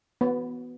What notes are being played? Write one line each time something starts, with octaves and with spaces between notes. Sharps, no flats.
B3